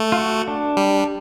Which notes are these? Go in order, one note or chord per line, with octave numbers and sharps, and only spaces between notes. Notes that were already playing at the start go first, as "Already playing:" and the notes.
Already playing: A3
F4
F#4
D4
G3